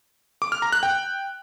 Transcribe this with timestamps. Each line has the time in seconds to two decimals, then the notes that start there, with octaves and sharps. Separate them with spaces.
0.42 D6
0.52 F6
0.62 A#5
0.72 F#6
0.83 G5